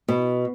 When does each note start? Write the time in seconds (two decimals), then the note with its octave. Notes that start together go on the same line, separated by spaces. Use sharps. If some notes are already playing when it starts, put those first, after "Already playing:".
0.08 B2